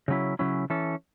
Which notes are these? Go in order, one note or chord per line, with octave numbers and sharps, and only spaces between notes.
C#3 F#3 C#4 E4
C#3 F#3 C#4 E4
E3 C#4 A4